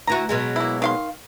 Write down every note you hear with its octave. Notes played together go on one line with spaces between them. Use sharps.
D2 E3 F#4 A#5
B2 F#3 G#3
A#3 E4
D#3 F5 C6